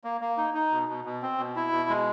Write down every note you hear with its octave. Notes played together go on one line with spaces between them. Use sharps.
A#3
A#3
D#4
D#4
B2
B2
B2
C4
B2
E4
B2
G#3